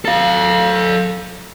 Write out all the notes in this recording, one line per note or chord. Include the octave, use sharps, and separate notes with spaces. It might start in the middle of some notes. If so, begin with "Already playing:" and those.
A4 F5